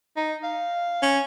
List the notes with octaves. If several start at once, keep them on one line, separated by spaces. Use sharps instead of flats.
D#4
F5
C#4